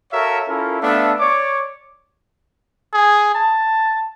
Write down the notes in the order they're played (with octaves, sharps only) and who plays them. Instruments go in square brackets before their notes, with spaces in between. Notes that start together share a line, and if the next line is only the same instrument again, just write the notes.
[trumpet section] F#4 A4 A#4 C#5 E5 F5
C#4 E4 F4 A4 A#4
A3 B3 D4 A4 E5 F5
C#5 D5 C#6 D6
[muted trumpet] G#4
A5